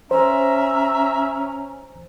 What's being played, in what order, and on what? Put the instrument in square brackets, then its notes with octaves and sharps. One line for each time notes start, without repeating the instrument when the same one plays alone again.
[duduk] C#4 [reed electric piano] C5 [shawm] E5 [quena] A#5